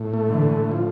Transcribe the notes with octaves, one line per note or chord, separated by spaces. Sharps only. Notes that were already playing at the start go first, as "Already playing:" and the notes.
Already playing: A2
A3
D3 E3
A2
F3